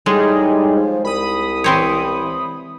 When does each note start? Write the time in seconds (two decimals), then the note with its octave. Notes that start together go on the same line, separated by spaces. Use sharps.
0.06 A2 G3 G#3 D#4 G#4
0.76 F3
1.04 C2 B5 D#6
1.64 E3 C4 C#5